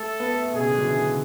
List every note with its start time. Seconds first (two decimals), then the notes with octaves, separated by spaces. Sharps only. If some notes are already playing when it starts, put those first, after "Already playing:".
Already playing: A3 A4
0.20 B3
0.32 A3
0.42 A3
0.53 B2 G#4
0.60 C#3
0.69 D3
0.77 F#3
0.84 E3
0.96 D3
1.06 C#3